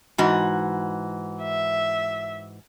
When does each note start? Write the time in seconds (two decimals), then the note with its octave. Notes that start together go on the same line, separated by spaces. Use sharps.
0.18 G#2 E3 F#4
1.43 E5